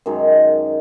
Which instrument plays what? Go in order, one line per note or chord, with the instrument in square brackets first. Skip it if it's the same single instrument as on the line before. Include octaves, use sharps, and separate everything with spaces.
[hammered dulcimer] F#2 D#3 G#3